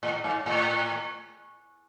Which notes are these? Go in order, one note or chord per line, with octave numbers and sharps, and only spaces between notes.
A2
G#2
A2